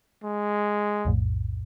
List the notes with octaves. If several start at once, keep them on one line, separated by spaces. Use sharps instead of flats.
G#3
B1 F2 A2